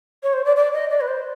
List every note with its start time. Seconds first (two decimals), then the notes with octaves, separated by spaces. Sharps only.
0.23 C#5
0.33 C5
0.45 D5
0.56 D5
0.73 D#5
0.90 D5
1.01 B4
1.08 C5